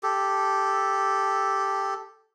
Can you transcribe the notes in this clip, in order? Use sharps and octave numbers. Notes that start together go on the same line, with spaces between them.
G4 A4